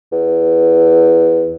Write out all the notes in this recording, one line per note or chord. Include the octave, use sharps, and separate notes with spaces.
E2